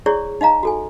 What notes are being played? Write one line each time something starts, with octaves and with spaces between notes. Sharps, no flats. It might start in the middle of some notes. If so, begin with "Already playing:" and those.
E4 G#4 C#5 D5 C#6
D#4 D#5 F5 A#5
F#4 A4 G#5